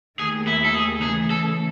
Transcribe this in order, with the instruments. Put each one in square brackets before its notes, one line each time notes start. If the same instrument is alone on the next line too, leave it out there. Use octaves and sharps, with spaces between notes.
[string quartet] D#2 D#3 A3 [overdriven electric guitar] G#4
[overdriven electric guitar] E4
A4
G#4
[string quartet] C#3 E3 A3 [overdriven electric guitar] G#4
[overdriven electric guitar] A4